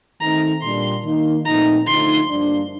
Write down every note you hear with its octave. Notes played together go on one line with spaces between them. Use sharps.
D#3 A3 C4 D#4 A#5
A#2 G3 D4 C6
D#3 A#3 D#4
A#2 F3 A3 C4 D#4 A#5
D3 F3 A3 D#4 C6
G2 F3 A#3 D4